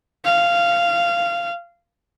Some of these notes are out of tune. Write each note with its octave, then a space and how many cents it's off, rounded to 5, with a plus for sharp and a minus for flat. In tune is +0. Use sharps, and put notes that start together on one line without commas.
F5 -15